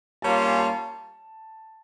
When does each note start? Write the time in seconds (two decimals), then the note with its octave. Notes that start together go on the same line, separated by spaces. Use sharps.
0.22 G3 A#3 C#4 F4 A5
0.46 G#5
0.57 A5